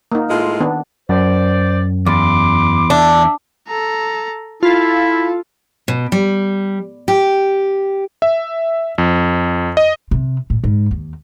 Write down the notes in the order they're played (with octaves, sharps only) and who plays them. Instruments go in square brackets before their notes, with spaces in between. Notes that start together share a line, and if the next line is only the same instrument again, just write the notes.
[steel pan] A#3 D#4
[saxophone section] A2 G#3 F4
[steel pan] D#3 B3 D4
[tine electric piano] F#2 [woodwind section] C5 D5
[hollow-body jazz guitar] E2 [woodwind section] B5 C6 D6
[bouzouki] D4 [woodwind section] E5
[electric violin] A4 A#5
[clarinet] E4 [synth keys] F4 [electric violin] A4
[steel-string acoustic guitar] B2
G3
G4
[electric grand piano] E5
F2
D#5
[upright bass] C3
A2
G#2
D#2